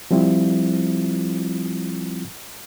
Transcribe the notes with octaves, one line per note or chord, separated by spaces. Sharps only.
F3 G3 C4 E4 F4